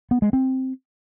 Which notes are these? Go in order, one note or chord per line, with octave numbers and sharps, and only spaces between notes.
B3
G#3
C4